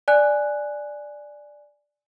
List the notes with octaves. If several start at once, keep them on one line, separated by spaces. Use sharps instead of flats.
D5 G#5 F#6